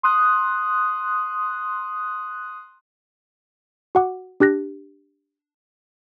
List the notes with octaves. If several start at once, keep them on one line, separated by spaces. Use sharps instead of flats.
C6 D#6 F#6
F#4 F#5 D6
D4 G4 F#6 A#6